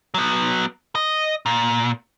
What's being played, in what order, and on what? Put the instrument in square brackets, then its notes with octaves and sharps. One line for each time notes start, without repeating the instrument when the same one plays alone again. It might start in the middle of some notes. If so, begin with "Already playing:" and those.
[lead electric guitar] F#3 B3
D#5
A#2